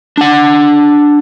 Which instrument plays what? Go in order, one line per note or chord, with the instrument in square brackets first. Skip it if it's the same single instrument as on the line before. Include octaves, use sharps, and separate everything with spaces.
[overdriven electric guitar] D4 F#5